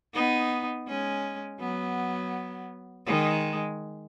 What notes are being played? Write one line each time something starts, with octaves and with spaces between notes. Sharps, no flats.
B3 D#4
G#3 C#4
F#3 B3
D#3 G#3